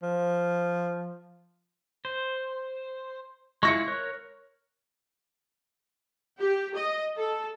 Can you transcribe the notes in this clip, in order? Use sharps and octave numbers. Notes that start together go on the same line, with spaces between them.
F3
C5
G#3 E4 F4 C#6 A#6 C#7
A#4 C#5 F#6
G4
D#5
A4